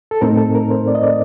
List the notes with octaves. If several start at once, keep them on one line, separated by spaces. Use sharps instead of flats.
A4
A2 A3 C4 D#4 A#4
A4
A#4
C5
D5
D#5
D5